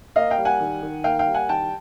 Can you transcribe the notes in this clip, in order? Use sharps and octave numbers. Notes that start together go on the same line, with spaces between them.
A#3 D#5 F5
F5 G5
G3
F#5 G#5
D#3
D#3
A#3 F5 G5
F5 G5
G3
F#5 G#5
D#3 G5 A5